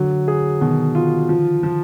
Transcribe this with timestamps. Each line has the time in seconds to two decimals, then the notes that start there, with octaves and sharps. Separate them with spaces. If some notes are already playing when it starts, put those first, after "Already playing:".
Already playing: D3 F#3
0.28 G#4
0.61 B2 D#3
0.95 F4
1.29 F3
1.63 F3